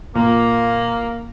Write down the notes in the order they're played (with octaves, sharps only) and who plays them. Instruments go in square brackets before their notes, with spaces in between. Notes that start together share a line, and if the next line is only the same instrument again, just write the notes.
[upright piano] A#2 [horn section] A#3